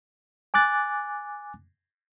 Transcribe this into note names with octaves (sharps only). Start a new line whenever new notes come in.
G#5 D6 F#6 A6